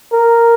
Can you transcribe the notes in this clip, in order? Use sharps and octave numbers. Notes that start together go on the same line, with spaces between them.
A#4